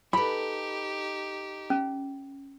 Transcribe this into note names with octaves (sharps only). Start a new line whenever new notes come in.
D#4 G4 A4 B4 B5
C#4